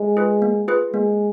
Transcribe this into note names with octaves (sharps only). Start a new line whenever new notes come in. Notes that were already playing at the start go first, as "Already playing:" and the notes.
Already playing: G#3
F4 G#4 B4
A#3
F4 G#4 B4
G#3 A#3